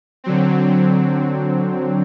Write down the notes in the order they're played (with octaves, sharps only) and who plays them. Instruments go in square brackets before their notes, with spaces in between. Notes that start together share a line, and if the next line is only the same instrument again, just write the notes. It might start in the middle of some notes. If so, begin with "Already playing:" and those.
[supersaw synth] D3 F#3 C4